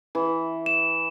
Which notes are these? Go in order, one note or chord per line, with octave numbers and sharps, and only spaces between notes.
E3
E7